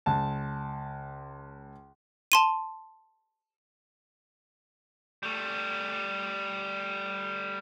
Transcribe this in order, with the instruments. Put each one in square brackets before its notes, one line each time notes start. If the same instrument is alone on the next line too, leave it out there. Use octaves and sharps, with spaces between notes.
[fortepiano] C#2 A5
[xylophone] A5 C6 D#7
[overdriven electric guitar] G3 A3